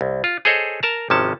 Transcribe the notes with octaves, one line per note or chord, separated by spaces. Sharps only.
C2
F4
G#4 A4 C5 C#5 D#5
A#4 A5 A#5
G#1 C3 F3 C#4 A5